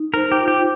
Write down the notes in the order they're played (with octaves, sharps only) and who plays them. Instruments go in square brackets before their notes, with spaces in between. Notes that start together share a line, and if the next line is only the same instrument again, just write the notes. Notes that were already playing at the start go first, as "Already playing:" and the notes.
Already playing: [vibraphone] D#4
[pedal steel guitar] A#4 [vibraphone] C5
[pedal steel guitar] G4
[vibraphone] F4
[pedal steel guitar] G4